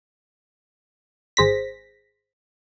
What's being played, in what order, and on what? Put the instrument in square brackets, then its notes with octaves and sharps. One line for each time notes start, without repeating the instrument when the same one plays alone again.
[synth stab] G#1 G#4 C5 A#6 B6